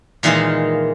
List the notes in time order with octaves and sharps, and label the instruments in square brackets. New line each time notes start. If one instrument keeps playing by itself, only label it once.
[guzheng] A#2 D#3 E3 G#3 D#4 F4